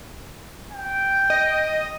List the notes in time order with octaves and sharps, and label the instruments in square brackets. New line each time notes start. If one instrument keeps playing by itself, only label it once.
[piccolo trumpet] G5
[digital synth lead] D#5